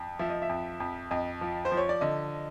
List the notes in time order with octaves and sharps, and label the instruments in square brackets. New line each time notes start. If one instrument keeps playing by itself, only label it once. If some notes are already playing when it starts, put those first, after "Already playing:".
Already playing: [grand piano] F2
[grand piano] F3 [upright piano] E5
[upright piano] D#5
E5
[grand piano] F2
F2
[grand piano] F2 [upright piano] D#5
[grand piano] F3
[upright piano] C5
[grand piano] F3
[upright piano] C#5
D5
[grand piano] D3 [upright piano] D#5